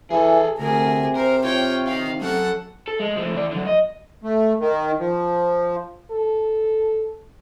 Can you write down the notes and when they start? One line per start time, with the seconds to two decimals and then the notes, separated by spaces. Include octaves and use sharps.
0.10 E3 G#4 A4
0.59 D2 C3 G#4 A#4
1.16 A#4 C5
1.44 F4 C#5 G5
1.87 D#4 F5 G5
2.21 F#3 C#4 A4 F#5
2.88 A4
3.00 G#3
3.16 F3 A3
3.35 E3 D5
3.51 D3 F#3
3.67 D#5
4.21 A3
4.59 D#3
5.00 F3
6.11 A4